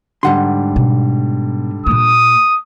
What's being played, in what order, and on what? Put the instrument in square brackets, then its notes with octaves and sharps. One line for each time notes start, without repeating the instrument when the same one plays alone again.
[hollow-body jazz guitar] G#2 F#5 C6 [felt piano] D3 G3
[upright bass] B2
[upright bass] A#2 A#3 [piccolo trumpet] D#6